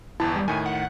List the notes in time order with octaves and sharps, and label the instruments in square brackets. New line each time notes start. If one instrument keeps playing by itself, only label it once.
[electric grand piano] G1 E2 A5 [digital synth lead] E4
[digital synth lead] G3
[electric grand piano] A2 D#3 [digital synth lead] G#5
[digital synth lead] F#5